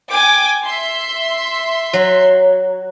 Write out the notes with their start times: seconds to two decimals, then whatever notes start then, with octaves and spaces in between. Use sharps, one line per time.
0.11 G5 G#5 D6
0.64 E5 C6
1.93 F#3